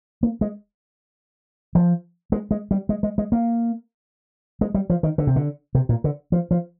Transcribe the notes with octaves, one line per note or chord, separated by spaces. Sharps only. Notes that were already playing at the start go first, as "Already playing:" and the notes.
A#3
G#3
F3
G#3
G#3
G3
G#3
G#3
G#3
A#3
G#3
G3
F3
D#3
D3
C3
D3
C3
A#2
D3
F3
F3